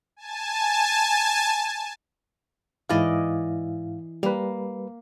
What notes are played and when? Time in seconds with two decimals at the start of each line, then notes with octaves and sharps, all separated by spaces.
0.16 G#5 A5
2.89 G#2 E3 E4 D5 D#5 F5
4.23 G3 A#3 B4